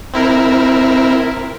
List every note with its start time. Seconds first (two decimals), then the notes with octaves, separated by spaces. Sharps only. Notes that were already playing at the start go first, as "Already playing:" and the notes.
0.14 C4 E4 A#4